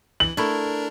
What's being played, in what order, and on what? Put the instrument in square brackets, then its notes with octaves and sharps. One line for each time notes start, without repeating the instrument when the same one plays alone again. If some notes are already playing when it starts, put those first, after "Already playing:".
[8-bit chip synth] E3 [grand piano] F#7
[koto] A3 E4 [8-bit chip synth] D4 A#4